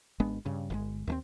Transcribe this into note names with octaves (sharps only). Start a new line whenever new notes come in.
G#1 G#3 B3 D4
G2 C#3
G1 D3 G#3
D#2 A3 C4